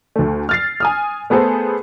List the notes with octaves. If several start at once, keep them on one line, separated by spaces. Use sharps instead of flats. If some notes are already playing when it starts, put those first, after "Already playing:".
D2 A3
F6 A6 C7
G#5 D#6 F6
A3 B3 G#4 A4 C5